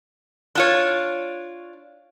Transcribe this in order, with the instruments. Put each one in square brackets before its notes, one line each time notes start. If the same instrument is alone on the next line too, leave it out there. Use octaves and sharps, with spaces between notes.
[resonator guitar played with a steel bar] D4 F4 C#5